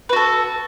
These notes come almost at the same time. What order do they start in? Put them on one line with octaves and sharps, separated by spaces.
B4 F#4 A4